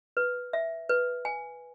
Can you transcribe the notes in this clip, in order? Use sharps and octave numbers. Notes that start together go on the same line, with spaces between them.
B4
E5
B4
G#5